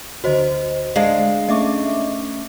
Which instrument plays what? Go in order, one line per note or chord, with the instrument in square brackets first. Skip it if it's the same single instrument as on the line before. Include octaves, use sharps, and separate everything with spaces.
[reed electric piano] D2 D3 [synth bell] F#4 C5 D#5
[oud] G#3 D4 [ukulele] F5 [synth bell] C7
[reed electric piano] A3 C#4 C#6 [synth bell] D#5 E5 D6